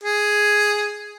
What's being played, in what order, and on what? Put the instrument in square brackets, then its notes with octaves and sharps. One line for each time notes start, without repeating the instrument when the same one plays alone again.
[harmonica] G#4